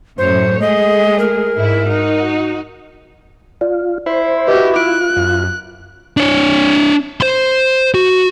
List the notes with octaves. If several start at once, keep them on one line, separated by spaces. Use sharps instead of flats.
F#2 A2 C5 C#5
G#3 A3 G#4 D#5
A#4
G#2 E4 E5
D#4 F#4
F4 D5
E4 C5
F#4 G4 B4 D#5
F4 F#6 D7
F#2
D4 C#5
C5 C6
F#4